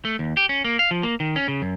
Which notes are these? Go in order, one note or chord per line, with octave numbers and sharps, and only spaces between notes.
A3
D#2
G4
C#4
A#3
F5
F3
A#3
D#3
C#4
C#3
F#2